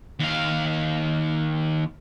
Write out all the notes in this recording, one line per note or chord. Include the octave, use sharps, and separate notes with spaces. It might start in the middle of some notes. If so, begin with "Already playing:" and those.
D#2 F5